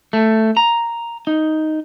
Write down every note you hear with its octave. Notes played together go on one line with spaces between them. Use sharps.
A3
A#5
D#4